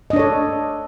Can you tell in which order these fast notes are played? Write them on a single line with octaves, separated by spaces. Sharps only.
D#5 D4 C#5 A4